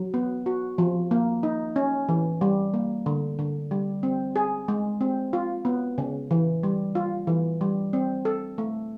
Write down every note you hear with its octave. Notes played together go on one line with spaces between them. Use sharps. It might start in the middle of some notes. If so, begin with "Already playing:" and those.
Already playing: F#3
B3
F#4
F3
A#3
D#4
C#4
E3
G3
A#3
D3
D3
G3
C4
G#4
G#3
C4
F4
B3
C#3
E3
G3
F4
E3
G3
C4
A4
A3